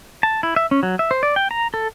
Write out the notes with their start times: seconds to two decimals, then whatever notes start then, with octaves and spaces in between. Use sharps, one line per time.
0.23 A5
0.43 E4
0.56 E5
0.71 C#4
0.83 F#3
0.99 E5
1.11 C5
1.23 D5
1.36 G5
1.51 A#5
1.74 A4